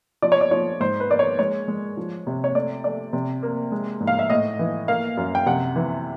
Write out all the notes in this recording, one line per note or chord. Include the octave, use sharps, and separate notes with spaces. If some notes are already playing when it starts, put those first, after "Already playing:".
F3 D5
C#5
D5
F3 C#5
G#2 C5
B4
A#3 D5
C#5
G#3 C#5
G#3
F3
C3
C#5
A3 D5
A3 D5
C3
A#3
G#3
G#2
F5
E5
A2 D#5
E3
A#3 F5
F#2
G5
C3 F#5
E3